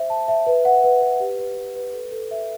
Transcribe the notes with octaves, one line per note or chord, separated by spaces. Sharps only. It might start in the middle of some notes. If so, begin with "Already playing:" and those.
Already playing: C5 E5
A5
E5
B4
F#5
B4
B4
G4
B4
G4
B4
A4
A4
E5